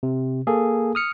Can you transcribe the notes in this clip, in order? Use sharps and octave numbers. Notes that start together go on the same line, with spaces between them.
C3
A#3 G#4 A4
D#6 F6 C#7